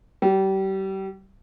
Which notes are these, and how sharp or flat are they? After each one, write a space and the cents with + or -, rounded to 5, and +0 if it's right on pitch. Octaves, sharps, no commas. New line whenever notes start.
G3 -30